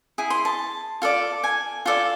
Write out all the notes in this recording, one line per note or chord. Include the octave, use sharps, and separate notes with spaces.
E4 G#4
C6
A5
F4 A4 D5
G#5
F4 A4 D5